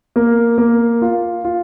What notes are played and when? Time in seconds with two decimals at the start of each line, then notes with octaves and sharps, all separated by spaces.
0.16 A#3
0.58 A#3
1.02 F4
1.44 F4